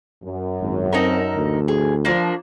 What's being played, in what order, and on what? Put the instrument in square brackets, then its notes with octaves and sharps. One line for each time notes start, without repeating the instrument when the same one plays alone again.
[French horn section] F#2
[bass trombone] G#1
[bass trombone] C4 [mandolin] D#4 A4 A#4
[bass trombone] D2
[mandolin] G#4
[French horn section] F3 [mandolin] A#3 D4